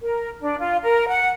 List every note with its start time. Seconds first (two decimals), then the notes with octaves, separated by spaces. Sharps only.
0.03 A#4
0.41 D4
0.59 F4
0.83 A#4
1.08 F#5